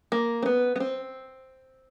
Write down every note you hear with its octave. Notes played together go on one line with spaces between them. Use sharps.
A#3
C4
B3
B3
C4